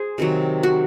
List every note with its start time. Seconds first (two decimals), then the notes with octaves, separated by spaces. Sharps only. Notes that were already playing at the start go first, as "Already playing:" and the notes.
Already playing: G#4 C5
0.18 C3 D#3 F#3
0.63 F#4